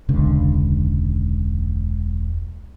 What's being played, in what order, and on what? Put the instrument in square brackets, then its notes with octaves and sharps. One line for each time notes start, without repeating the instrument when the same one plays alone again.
[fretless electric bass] E1 C#2 D3